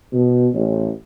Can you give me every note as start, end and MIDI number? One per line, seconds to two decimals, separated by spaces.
0.12 0.46 47
0.53 0.88 33